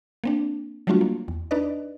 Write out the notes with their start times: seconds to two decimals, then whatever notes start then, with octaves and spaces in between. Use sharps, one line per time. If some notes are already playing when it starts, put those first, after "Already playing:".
0.24 A#3 C4 D4
0.87 F#3 G3 A3 D4 F4 F#4
1.01 A#3
1.28 E2
1.51 D4 D#4 B4 D5 D#5